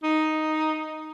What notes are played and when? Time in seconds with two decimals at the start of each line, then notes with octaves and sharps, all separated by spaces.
0.03 D#4